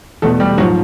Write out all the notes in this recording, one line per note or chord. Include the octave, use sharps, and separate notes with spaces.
E2 B2 A3 A4
G3 G4
G#2 F3 F#3 F#4